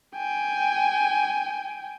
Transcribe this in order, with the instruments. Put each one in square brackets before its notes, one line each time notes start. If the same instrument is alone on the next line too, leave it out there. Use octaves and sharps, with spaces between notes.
[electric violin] G5 G#5